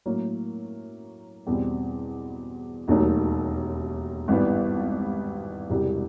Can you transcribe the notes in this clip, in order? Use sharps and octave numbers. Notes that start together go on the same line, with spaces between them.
A2 F#3 A#3
E2 B2 G3 C4
E1 D#2 D#3 F#3 A3
G#1 G2 E3 G3 B3
E1 E2 C3 E3 G3